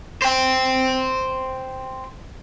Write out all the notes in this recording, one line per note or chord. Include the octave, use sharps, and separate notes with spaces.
C5 G5